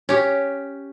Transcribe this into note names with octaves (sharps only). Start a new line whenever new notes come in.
C#4 G4